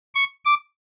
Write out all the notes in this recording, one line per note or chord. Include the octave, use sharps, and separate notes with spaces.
C#6
D6